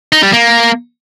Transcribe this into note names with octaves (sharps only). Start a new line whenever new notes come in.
D#4
G3
A#3